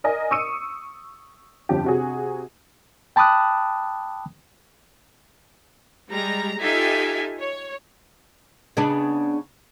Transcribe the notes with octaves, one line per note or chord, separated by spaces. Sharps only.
A#4 D5 D#5 G#5
C#6 D#6 E6 C#7 D#7
G1 F2 G4
C3 F#4 G#4
G5 A5 B5 D6 D#6 F#6
G3 G#3 A#5
D#4 F4 G4 A4 E5 G#5
C#5
C#3 B3 D4